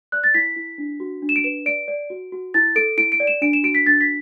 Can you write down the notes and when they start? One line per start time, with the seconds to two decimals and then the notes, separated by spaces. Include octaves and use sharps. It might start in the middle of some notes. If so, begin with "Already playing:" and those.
0.12 D5 F#6
0.24 A6
0.34 E4 B6
0.56 E4
0.78 D4
1.00 F#4
1.22 D4
1.29 E7
1.36 D7
1.44 B4 E7
1.66 D5 D7
1.88 D5
2.10 F#4
2.32 F#4
2.54 E4 A6
2.76 A4 D7
2.97 E4 D7
3.12 D7
3.20 D5
3.27 E7
3.42 D4 D7
3.53 E7
3.63 F#4 D7
3.75 B6
3.86 D4 A6
4.01 B6